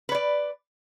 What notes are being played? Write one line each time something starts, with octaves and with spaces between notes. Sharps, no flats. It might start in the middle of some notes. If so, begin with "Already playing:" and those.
B4 C#5 D5